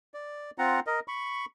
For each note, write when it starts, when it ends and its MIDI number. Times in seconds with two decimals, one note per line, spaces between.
0.14 0.51 74
0.58 0.80 60
0.58 0.80 65
0.58 0.80 78
0.58 0.80 82
0.87 1.00 70
0.87 1.00 75
1.08 1.46 83
1.08 1.46 85